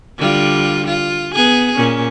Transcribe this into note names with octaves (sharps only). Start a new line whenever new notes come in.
D3 G3 F4
F4
B3 G#4
A#2 C#4